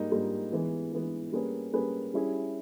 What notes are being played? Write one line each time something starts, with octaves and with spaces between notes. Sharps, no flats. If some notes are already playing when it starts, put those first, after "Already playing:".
Already playing: G#2 G3 A#3 D#4
G#2 G3 A#3 D#4
E3 G#3 B3
E3 G#3 B3
G3 A#3 C#4 G#4 B4
G3 A#3 C#4 G#4 B4
G3 C#4 E4 G#4